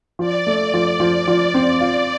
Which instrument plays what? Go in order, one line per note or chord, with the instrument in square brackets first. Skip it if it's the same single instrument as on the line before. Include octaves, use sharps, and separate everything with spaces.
[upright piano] F3 [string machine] D5
[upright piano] A3
F3
F3
F3
C4
F4